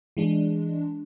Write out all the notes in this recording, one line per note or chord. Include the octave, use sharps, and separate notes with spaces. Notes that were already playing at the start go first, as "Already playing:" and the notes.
E3 G#3 D4